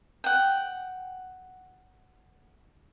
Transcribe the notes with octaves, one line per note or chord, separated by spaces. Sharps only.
F#5 G5